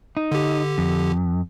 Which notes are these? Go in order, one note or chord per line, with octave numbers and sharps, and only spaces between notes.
D#4
D3 G4
F2